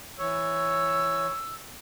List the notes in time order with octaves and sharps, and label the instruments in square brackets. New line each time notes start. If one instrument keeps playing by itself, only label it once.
[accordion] E3 C#5 [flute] E6